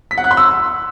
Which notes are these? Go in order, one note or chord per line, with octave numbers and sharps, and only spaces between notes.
B6
F#5
F#6
C6
E6